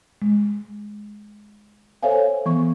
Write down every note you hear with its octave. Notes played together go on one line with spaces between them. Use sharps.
G#3
A4 C5 C#5 E5 F5 G#5
E3 B3 C#6